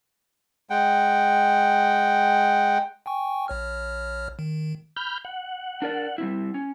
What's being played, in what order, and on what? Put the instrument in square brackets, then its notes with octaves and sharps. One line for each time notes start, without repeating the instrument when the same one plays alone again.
[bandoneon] G#3 F#5 G5
[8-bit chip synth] G5 G#5 C#6
A#1 C#5 F6
D#3
[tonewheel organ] B5 F6 G6
F#5
[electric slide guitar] D4 A#4 D5
G3 C4 E4
C#4